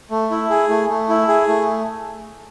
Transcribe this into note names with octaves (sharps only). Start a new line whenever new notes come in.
A3
E4
G#4
A3
A3
E4
G#4
A3